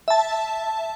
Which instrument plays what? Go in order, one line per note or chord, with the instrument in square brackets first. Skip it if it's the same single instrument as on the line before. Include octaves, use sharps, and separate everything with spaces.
[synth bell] E5 A5